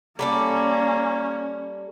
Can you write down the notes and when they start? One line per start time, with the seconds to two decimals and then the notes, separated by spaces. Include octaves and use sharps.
0.19 G3 A#3 C#4 A4 D5